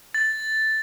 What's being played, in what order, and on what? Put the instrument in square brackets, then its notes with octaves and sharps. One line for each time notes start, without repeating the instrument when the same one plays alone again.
[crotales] A6